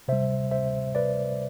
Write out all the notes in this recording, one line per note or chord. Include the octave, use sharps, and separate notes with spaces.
C3 G3 C5 E5
C5 E5
B4 D5